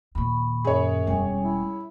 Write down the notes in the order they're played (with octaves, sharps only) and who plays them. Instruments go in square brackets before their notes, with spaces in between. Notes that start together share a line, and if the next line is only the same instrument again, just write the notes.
[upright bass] D#2 A#2 [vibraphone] B5 C#6
[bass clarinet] F#2 [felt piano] G#4 C#5
[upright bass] E1 G#3 [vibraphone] G3 C#4 G#5
[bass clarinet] E4